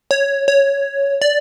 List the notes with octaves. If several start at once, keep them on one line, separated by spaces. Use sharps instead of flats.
C#5
C#5
D5